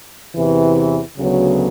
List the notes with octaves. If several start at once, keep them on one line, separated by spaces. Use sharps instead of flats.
E2 C3 E3
D2 C#3 F#3 B3